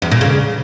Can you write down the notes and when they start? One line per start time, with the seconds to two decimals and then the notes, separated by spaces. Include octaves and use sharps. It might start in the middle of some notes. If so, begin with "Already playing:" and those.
0.02 E2
0.11 A#2
0.21 C#3